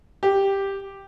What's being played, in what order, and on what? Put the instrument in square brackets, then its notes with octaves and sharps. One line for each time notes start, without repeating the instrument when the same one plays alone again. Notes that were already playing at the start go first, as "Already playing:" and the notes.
[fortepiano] G4